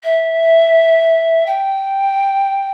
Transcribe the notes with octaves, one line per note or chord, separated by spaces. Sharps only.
E5
G5